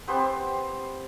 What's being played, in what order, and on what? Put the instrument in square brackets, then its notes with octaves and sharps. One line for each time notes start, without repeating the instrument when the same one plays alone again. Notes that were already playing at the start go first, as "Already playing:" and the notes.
[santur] B3 C4 G4 C5